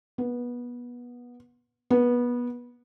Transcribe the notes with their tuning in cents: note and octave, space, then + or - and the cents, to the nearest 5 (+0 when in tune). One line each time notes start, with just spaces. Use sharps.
B3 -20
B3 -20